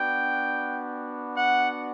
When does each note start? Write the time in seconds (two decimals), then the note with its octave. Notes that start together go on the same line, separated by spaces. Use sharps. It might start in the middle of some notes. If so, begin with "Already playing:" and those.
Already playing: B3 D4 F#4 G5
1.36 F#5